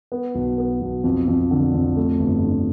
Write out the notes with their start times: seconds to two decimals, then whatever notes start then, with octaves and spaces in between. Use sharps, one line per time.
0.12 B3
0.35 B1
0.58 B3
0.82 B1
1.04 F2
1.28 F2
1.51 D3
1.74 F2
1.96 A3
2.20 G1
2.44 D3